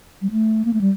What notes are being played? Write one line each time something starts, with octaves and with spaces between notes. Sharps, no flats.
G3
A3
A#3
A3
G3